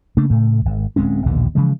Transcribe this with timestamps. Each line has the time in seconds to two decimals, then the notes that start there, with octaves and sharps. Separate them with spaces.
0.17 C#3 A3 A#3 D4
0.30 A2 C#3 A3
0.65 G#1
0.96 D1 G#3 C4 C#4
1.26 A#1 D#2 B2 D3
1.55 C#3 E3 F3 G#3